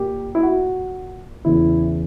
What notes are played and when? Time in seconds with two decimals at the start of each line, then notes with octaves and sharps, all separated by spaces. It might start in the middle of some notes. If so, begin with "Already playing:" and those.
Already playing: A#2 A#3 G4
0.35 E4
0.43 F#4
1.45 E2 C#3 E3 E4